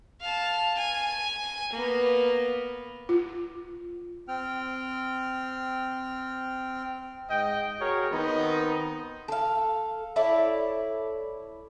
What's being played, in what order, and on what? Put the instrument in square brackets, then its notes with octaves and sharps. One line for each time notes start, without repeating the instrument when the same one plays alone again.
[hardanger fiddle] F5 A5
G#5
A#3 B3
[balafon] F4
[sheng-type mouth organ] C4 G5 F6
[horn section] G#2 D#5 G5
F#4 G#4 A#4 C#5
D#3 B3 C4 D#4
[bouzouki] A4 F5
E4 A4 C#5 D5